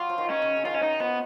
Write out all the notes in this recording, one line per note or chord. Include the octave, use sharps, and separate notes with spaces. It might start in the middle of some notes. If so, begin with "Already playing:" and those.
Already playing: F#3 F4
F3
D#3
C#4
C#3
C#3
D#3 F4
C#4
D#4
F3 B3